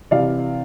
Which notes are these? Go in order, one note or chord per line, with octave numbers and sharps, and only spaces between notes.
C3 E3 D5 F5